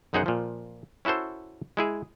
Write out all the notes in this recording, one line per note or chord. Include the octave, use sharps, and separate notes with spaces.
B1 F#2 D#4 G#4 C5 F#5
A#2 F3
C#4 E4 F#4 A4 C5
G#3 E4 G#4